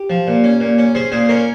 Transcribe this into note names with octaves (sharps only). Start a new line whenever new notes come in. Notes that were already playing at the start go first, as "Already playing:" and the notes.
Already playing: G4
F3
A#2
C#4
A#2
C#4
C#4 G#4 C5
A#2 G#4 C5
C#4 A#4 C#5